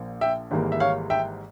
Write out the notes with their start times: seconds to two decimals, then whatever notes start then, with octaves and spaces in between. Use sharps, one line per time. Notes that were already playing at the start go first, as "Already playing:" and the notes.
Already playing: A#1 A#2 F3 A#3
0.21 E5 G5
0.51 G#1 G#2 E3 G3 A#3
0.72 E5
0.80 C#5 F5
1.10 E5 G5